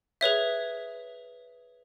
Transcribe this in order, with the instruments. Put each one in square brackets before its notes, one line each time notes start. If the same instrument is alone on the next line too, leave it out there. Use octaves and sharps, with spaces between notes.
[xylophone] G#4 B4 C#5 E5